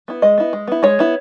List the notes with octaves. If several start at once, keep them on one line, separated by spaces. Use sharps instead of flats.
B3 E4
G#3 D#5
B3 E4
G#3
B3 E4
G#3 C#5
B3 E4